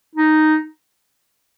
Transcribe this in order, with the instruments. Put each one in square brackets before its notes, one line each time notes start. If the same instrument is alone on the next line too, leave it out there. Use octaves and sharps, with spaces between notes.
[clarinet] D#4